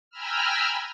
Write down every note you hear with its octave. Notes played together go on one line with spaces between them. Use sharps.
G5 G#5 A#5 B5 E6 F6